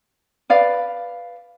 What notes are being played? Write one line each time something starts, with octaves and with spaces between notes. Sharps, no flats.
B4 D5 F5